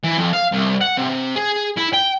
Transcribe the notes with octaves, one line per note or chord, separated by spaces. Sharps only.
E3
F2
F5
C2
F#5
C3
G#4
E4
G5